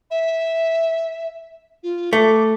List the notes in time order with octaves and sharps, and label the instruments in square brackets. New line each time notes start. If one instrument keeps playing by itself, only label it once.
[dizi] E5
F4
[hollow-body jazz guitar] A3 [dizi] D6